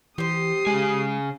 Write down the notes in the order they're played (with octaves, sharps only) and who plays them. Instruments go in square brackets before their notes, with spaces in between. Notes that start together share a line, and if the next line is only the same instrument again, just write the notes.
[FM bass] E3 [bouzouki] G4 C5 [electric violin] D#6 C7
[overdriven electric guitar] C#3 G#5 [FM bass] G#3